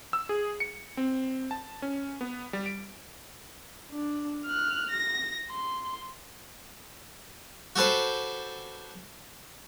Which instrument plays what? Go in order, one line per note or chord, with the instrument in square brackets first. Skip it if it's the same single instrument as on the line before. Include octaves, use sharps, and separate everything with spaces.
[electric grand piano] E6
G#4
C#7
C4
A5
C#4
B3
G3
D7
[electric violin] D4
F6 F#6
A#6
C6
[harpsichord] F#4 G4 A4 B4 C5